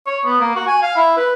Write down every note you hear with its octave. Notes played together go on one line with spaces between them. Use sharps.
C#5
B3
A#3
F#4
G#5
F5
E4
B4